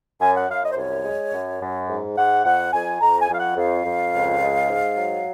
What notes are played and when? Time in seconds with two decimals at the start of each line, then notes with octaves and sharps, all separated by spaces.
0.21 F#2 G#5
0.35 F#5
0.49 F#2 F5
0.63 D#5
0.71 C5
0.77 C2 C#5
1.05 G#3
1.33 F#2
1.61 F#2
1.89 G#2
2.17 G#2 F#5
2.45 F2 F#5
2.73 F2 G#5
3.01 F2 A#5
3.20 G#5
3.29 F2 F5
3.38 F#5
3.57 F2 F5
3.85 F2
4.13 C#2
4.41 G#3
4.69 G#2
4.97 F#3